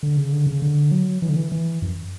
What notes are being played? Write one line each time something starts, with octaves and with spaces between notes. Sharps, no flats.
D3
C#3
D3
C#3
D3
F#3
E3
D3
E3
E3
F#2